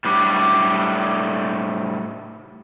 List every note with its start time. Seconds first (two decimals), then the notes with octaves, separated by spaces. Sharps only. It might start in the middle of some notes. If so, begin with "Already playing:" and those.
0.05 A2 G3 D4